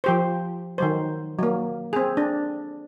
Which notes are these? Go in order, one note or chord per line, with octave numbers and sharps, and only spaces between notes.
F3 G4 C5
D#3 F#3 C5
F#3 A#3
C4 G#4
D4